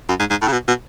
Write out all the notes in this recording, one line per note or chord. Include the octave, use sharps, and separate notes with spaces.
F#2
G#2
G#2
A2
C#3
B2
B2